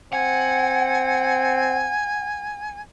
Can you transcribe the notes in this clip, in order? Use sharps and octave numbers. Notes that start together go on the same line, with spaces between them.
C4 F#5 G#5